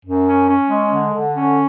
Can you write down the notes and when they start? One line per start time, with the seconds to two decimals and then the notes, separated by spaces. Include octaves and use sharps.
0.05 F#2
0.28 C#4
0.49 C#4
0.70 G#3
0.92 D3
1.13 D3
1.35 C#4